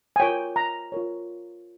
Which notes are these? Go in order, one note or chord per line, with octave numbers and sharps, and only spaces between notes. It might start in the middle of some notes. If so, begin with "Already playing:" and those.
G#5
F4 A#4 C#5 G5
A#5
F4 A#4 C#5